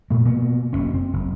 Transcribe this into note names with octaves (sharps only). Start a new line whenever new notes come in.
A#2 A3
B2 A#3 B3
F#1 B2 C#4
C4
F#1